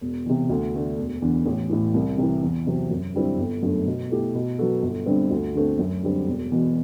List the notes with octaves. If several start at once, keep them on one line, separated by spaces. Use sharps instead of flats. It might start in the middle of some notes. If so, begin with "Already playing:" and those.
E1
E2 C3
D2
D3 A3 D4
E1
E2 D3
A1
A2 E3
C2
C3 E3
E2
C3 F#3 C4
F#2
D3 G3 C4 E4
G1
F#2 D3 A3
B2
A3 E4 G4
B2
F#3 B3 F#4 A4
G1
G2 D3 G3 C4
D2
D3 A3 C4
F#2
D3 G3 C4
E1
E2 B2